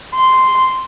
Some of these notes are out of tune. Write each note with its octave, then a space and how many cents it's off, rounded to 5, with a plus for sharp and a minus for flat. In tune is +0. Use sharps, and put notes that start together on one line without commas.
C6 -5